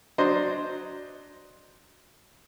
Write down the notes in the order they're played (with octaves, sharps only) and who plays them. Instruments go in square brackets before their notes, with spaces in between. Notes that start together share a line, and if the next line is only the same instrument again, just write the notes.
[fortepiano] F#3 D4 C5 D#5